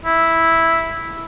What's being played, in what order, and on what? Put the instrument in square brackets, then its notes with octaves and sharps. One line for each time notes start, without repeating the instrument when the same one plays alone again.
[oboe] E4